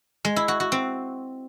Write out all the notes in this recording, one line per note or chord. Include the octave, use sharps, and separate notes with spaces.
G#3
E4
F#4
F#4
C4